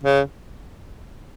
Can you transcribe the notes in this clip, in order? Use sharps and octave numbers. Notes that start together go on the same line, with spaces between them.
C#3